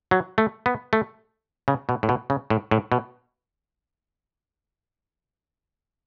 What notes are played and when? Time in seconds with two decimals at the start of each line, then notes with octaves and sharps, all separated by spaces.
0.11 F#3
0.38 A3
0.66 B3
0.93 A3
1.68 C#3
1.89 B2
2.03 A2
2.09 B2
2.30 C#3
2.50 A2
2.71 A2
2.92 B2